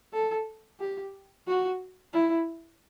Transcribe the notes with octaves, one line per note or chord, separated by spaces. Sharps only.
A4
G4
F#4
E4